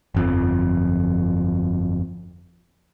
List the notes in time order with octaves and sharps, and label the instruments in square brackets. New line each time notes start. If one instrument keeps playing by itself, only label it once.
[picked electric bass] G1 F2 F3